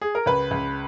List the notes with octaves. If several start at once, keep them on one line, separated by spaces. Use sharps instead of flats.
G#4
A#4
C#2 B4
C#2